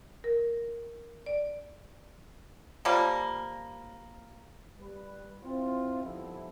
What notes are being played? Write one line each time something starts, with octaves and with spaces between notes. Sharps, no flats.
A#4
D5
F3 G3 A#3
G3 B4
C4 E4 F4
D3 F3 G3 B3 D#4 E4